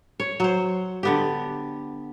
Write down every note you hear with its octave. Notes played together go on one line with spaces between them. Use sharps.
C#5
F#3 C5
D3 B3 G4